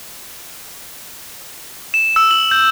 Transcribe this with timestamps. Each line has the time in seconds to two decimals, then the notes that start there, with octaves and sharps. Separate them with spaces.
1.94 E7
2.16 E6
2.31 F#7
2.51 G6